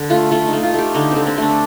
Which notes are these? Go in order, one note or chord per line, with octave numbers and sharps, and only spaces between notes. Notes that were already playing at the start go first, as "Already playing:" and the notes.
Already playing: D3
A3 F4
A3 F4
D#4
A3
F4
A3 G4
D3 D#4
D3 C4
C4
A3 D4